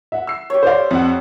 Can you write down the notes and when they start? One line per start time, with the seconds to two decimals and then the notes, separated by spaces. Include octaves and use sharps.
0.12 E5 F#5
0.27 E6 C7
0.50 G4 C#5
0.63 C5 D5 F5
0.91 F2 F#5